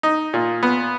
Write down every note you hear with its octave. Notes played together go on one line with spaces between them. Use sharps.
D#4
A#2
B3